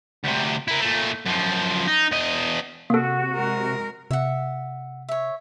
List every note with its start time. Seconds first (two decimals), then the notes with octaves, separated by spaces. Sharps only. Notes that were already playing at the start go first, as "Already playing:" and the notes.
0.24 D2 C3
0.68 E4 A#4
0.80 A#2 A3
1.26 F#2 F3
1.88 D#4
2.12 E2 D#5
2.90 C3 A#3 F#4 A4
3.36 G#3 A#4
4.11 C3 E5 F#5
5.09 C#5 E5